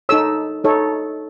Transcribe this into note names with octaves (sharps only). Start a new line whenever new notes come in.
D#4 A4 C#5 E6
D#4 A4 C#5